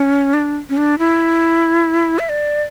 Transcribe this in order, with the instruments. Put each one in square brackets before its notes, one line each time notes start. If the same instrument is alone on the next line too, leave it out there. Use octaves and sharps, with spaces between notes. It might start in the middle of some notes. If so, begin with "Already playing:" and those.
Already playing: [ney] C#4
D4
C#4
D4
E4
E5
D5